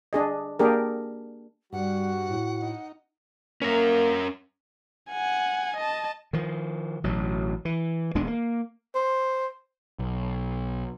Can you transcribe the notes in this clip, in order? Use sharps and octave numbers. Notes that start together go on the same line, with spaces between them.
D4 G#4 D#5
A#3 D4 G4 G#4 A#4
G2 G3 F#4 F#5
A2
D#4
A#3 C#4 A#4
F#5 G#5
D#5 A5
D#3 F3
A1 B2 F#3
E3
D#1 G#3 B3 D4
A#3
C5
B1